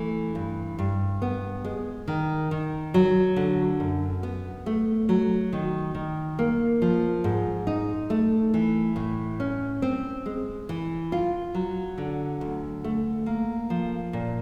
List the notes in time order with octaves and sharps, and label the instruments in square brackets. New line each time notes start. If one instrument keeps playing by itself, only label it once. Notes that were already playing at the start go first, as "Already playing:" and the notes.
Already playing: [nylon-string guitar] E3 A3
G2
G2
B3
G#3
D#3
D#3
F#3
D3
F#2
B3
A3
F#3
D#3
D#3
A#3
F3
G#2
D#4
A3
E3
A2
C#4
C4
G#3
E3
F4
F#3
D3
D2
A3
A#3
F3
A#2